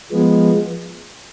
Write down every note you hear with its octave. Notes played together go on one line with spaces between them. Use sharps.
F3 G#3 B3